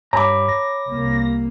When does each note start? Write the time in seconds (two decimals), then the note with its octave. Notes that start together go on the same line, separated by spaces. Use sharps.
0.13 G2 C#5 A#5 B5 D6
0.48 A#6
0.89 C2 A#3